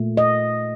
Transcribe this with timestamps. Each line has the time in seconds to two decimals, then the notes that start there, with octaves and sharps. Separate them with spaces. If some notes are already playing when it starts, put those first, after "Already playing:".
Already playing: A#2 A3
0.17 D#5